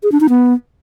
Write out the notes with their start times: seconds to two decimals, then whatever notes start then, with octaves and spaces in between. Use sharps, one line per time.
0.03 G#4
0.12 D4
0.20 D#4
0.29 B3